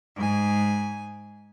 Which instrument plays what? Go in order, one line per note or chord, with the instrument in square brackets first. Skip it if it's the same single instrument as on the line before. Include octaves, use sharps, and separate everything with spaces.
[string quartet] G#2 G#5